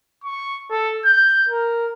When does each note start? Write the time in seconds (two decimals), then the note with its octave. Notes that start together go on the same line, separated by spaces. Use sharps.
0.24 C#6
0.71 A4
1.05 G6
1.49 A#4